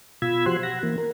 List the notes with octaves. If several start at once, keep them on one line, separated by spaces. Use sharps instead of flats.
B2 F4 B5 E6 G#6
F3 F#4 G4 C5 C6 F#6
F#5 A#6
E3 A#3
A#4